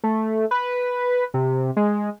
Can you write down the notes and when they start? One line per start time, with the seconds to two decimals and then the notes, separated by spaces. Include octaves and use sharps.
0.04 A3
0.51 B4
1.34 C3
1.77 G#3